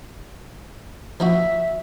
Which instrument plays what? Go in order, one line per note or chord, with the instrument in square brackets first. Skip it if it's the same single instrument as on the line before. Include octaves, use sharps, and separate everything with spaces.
[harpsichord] F3 D#4 F#4 [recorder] E5